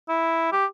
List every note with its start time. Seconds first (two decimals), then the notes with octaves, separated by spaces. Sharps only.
0.09 E4
0.52 G4